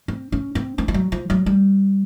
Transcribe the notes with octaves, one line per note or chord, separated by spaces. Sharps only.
C4
C#4
C4
C4
F3
F#3
F3
F#3
G3